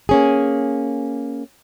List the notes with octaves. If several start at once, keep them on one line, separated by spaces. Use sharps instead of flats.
A#3 C#4 G#4